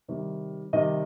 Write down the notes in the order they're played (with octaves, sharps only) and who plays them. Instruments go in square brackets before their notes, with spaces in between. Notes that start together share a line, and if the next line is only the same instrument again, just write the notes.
[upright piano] C3 D#3 G3
C3 D#3 G3 D#5